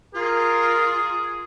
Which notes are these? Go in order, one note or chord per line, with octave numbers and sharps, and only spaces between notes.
F4 G#4 A#4